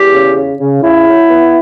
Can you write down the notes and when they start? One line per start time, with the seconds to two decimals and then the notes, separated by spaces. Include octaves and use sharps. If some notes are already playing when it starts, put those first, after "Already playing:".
Already playing: E2 G4
0.13 C#3
0.36 C#3
0.60 C#3
0.82 C#3 E4
1.06 F#3
1.29 B3